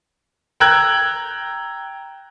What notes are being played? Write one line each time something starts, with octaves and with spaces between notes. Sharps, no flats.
G5 A#5 E6 F#6 G#6 F#7